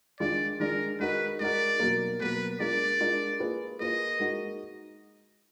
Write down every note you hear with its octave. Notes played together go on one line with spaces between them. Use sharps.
D#3 G#3 D4 F4 D5
D#3 G#3 D4 F4 A#4
G#3 D#4 F#4 A#4 B4
G#3 D#4 F#4 A#4 D5
B2 F#3 A#3
B2 F#3 A#3 B4
G#3 D4 F4 A#4 D5
G#3 D4 F4 A#4
A#3 F4 G#4 B4
A#3 F4 G#4 B4 D#5
G#3 D#4 F#4 A#4